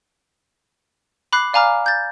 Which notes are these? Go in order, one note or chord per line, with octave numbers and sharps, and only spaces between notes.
B5 D6 F#6 C7
D5 F5 G#5 A#5 D6 F6
G6 A6